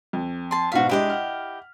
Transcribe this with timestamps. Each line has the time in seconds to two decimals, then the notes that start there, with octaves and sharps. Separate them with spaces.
0.13 F2
0.51 A5 C6
0.72 G#2 B2 F#4 F5 B6
0.89 G#3 D4 E4 G4 D#5
1.10 F#5 F6